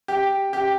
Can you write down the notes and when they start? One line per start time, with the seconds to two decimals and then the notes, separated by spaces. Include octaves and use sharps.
0.08 G4
0.53 G4